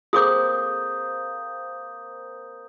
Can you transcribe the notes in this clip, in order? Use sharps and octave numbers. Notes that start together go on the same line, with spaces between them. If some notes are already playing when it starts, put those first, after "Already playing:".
A#3 C4 G#4 A4 C5 D6 D#6 G6